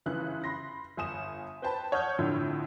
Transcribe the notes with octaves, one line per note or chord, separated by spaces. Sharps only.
G1 C#3 E3 F#6
B5 C6 A#6
G1 G#5 D#6 E7
B4 C5 G5 A5 B5
C#5 F#5 D#6 F6 G6
F2 A2 D3